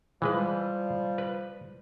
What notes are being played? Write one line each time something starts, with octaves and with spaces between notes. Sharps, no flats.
E3 F3 G3 G#3 B4
B4